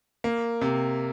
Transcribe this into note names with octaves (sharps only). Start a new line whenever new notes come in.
A#3
C3